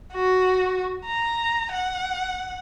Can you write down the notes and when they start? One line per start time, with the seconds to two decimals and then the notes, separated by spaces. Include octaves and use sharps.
0.14 F#4
1.07 A#5
1.73 F#5